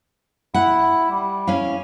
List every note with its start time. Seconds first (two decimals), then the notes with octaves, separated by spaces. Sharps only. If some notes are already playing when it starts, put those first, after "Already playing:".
0.54 E4 F#5
1.10 G3
1.47 C#4 E4 F5